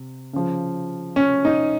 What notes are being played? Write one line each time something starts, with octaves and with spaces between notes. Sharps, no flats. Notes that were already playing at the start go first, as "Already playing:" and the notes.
Already playing: C3
C#3 F3
C#4
D#4